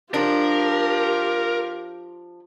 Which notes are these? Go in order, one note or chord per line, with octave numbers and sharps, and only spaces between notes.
F3 D4 F4 G4 A#4